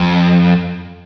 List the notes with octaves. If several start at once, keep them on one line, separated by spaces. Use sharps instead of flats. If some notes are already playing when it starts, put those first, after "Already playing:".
Already playing: F2